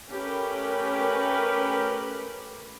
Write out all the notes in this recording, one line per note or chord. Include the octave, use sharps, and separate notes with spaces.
A3 C#4 G4 A#4 B4